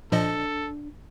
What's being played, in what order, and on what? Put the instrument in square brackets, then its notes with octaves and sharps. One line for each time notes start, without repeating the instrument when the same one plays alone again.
[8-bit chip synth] A#2 F3 D#5 [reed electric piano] D4 [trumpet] A4